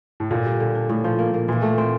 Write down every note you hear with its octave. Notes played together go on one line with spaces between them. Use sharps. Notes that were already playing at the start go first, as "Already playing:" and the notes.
A2
A#2 D3
G3
D3
D4
A2
F3
A#3
A#3
A#2 E3
A3
C4